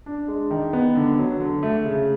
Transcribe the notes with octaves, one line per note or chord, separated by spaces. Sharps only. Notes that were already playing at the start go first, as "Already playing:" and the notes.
D4
G#3
D#3
B3
D3
F#3
D3
A3
C#3